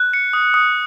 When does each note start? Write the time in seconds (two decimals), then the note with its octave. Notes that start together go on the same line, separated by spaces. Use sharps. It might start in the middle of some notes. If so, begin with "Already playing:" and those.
Already playing: F#6
0.13 C#7
0.33 D#6
0.54 D#6